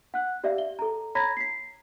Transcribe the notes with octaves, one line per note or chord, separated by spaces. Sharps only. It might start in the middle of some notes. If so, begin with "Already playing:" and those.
F#5 F#6
G4 D5 E5 F5
G7
A4 A#5
C#5 A#5 B5 G#6 A#6 B6
B6 C7